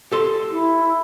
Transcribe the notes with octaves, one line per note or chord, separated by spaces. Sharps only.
G4 A4 C6
E4